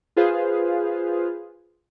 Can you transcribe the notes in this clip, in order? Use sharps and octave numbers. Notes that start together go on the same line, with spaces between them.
F4 G#4 B4 C5 F5